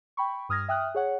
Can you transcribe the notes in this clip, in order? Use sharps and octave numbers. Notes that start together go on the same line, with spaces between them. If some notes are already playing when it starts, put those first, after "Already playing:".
G5 B5 C#6
G2 D#6 F6 G#6 A#6
E5 G5 D#6 F6 F#6
G#4 C#5 F#5